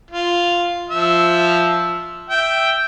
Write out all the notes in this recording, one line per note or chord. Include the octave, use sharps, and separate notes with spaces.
F4
F3 E5
E5 G5